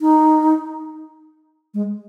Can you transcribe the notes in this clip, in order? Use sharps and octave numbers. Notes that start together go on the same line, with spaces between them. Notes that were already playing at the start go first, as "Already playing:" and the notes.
D#4
G#3